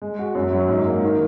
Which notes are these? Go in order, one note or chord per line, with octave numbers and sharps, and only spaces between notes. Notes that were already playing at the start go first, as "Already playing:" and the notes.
G#3
F#4
F#2
F#3
G#2
A#3
D#3